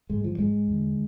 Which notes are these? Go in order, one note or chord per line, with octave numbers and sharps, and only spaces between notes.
G#2 G#3
F3
G#2 G#3
E2 D3